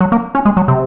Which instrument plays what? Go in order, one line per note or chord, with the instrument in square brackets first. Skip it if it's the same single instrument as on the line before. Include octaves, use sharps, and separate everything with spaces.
[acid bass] F#3
A#3
C#4
G#3
F#3
C3